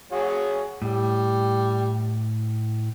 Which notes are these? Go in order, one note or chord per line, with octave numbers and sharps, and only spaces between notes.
F#4 G#4 C#5
A2 G3